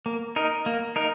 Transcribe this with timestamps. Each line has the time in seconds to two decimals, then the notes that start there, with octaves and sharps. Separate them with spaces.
0.06 A#3
0.36 D#4 A#4
0.66 A#3
0.96 D#4 A#4